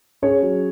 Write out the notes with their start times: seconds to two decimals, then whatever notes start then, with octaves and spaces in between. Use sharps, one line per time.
0.22 C#4 G#4 C#5
0.42 F#3